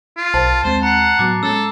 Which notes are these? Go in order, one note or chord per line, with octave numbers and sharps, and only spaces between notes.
F4
B1 C5 A5 A6
D#2 G#3 C4 C5
F#5 A#5 C7
A2 F#3 B3 D6 A6
G#3 C#4 A4 E6